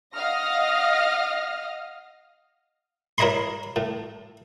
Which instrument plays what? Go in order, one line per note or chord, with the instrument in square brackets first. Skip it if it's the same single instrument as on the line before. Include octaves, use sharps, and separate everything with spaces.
[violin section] D#5 F5 F#5 D#6 F6 A#6
[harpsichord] E4 A#4 C#5 D#5 B5 C6
A2